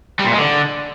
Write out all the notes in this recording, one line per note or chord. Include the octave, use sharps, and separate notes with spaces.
G3
A#2
G#3
D3